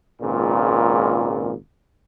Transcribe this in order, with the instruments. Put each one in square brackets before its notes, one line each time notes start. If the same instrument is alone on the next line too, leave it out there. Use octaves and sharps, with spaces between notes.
[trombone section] G#1 C#2 A#2